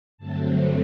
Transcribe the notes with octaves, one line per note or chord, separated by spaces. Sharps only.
G2 D3 F#3 A3 C4 A5